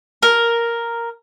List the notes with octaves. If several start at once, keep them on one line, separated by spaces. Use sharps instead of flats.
A#4